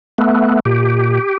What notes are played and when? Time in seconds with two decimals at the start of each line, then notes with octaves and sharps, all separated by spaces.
0.18 A3 B3
0.65 A#2 G4